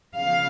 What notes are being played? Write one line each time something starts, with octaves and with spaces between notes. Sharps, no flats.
C#3 F3 B3 F5